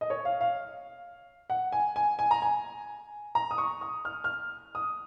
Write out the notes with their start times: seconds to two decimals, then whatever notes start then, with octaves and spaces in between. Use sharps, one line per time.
0.01 D#5
0.10 C#5
0.25 F5
0.41 F5
1.50 F#5
1.72 G#5
1.96 G#5
2.19 G#5
2.31 A#5
2.42 G#5
3.35 A#5
3.51 D#6
3.58 C#6
3.81 D#6
4.05 F6
4.24 F6
4.75 D#6